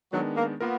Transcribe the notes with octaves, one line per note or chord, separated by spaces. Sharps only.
D#3 F#3 G#3 B3 D4
A#3
A#3 B3 F4 A#4